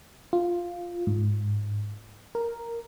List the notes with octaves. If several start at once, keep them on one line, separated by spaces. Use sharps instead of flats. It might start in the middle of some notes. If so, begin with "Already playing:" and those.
F4
G#2
A#4